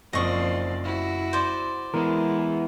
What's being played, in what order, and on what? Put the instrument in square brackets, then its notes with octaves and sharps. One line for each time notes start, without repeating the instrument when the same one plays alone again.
[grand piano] F#1 [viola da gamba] F3 C4 D5 [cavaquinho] D#5 C#6 D#6
[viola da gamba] E4 F#4
[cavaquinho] C5 D5
[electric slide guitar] E3 B3 E4 [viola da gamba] G#3 [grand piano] A#4